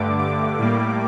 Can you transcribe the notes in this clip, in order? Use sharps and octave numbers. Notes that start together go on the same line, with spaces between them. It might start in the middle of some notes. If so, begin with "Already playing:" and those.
Already playing: G2 D3 A3 D6
D6
A2 G3 A#3 D6